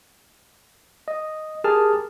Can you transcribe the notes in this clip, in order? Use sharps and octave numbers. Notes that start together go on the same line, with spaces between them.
D#5
G4 G#4 A#4 A5 F6